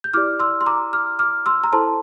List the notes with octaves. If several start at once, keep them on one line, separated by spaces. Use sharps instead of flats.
G6
E4 G4 D5 D6 F6
C6 E6
C6
A#5 D6
D6 F6
D6 F6
C6 E6
A#5
E4 A4 C5 A5 C6